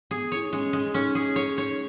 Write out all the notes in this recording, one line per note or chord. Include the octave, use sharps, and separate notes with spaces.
B3 G#4
E4 C#5
D#4
G#3 C#4
G#3
C#4 D#4
G#4
C#5
C#5